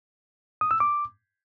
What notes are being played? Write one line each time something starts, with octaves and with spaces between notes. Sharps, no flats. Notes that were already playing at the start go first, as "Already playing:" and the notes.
D#6
E6
D6